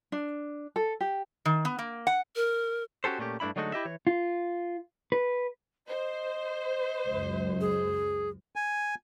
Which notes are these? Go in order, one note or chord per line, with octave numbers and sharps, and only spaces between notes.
D4
A4
G4
D#3
B3
A#3
F#5
A#4
C#4 F#4 G4 A4 C5
A#2 A3 B3 C#4 G4
G2 A3 D4 E4 B5
D3 F#3 G#3 A3 D#4 F#4
E4 G4 D#5 E5
E3 C#5
F4
B4
C5 D#5
C#2 F#2
G#4
G#5